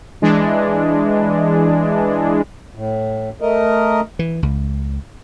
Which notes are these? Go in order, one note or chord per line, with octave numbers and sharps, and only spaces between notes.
E3 G#3 D4
A2
A3 A#4 D#5
E3
C#2